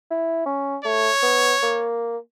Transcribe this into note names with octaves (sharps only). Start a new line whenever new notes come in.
E4
C#4
A3 C#5
B3
A#3